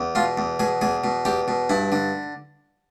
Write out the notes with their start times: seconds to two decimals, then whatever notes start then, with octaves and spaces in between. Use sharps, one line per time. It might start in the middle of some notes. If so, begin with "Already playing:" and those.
Already playing: E2
0.15 B2 F4
0.38 E2
0.59 B2 G#4
0.81 E2 G#4
1.04 B2
1.25 E2 G4
1.48 B2
1.69 G2 E4
1.92 D3